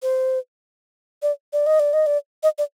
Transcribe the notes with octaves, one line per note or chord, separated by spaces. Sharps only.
C5
D5
D5
D#5
D5
D#5
D5
D#5
D5